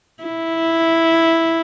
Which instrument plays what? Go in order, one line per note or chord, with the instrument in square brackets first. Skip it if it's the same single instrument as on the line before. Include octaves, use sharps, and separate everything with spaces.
[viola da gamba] E4